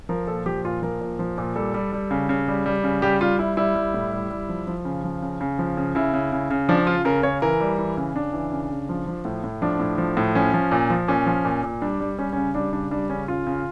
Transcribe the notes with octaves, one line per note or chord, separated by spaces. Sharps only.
F3 A#4
A#2 A4
F3 G4
A#2 F4
F3 A#4
A#2
F3
A#2
G3 A4
G3
G3
C#3
C#3
G3
G3
C#3
G3 G4
G3 F4
G3 E4
G3 E4
G3
A2
G3
G3
F3
F3
C#3
F3
C#3
C#3
F3
C#3
C#3 E4
C#3
C#3
C#3
F3 D4
C#3 F4
C#3 A#4
C#3 C#5
E3 A#4
G3
E3
C#3
C#3 D4
E3
C#3
C#3
F3
F3
A2
A2
F3 D4
A2
F3
A2
F3 C#4
F3
A#2
F3
A#2 C#4
F3
A#2
A#2
G3 D4
G3
G3 C#4
C#3 C#4
G3 D4
C#3 D4
G3 D4
C#3 C#4
C#3 F4
C#3